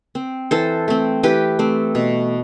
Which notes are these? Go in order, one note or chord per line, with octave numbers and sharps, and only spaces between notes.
C4
E3 A4 C5
A3 C4
E3 G4 B4
A3 C4
B2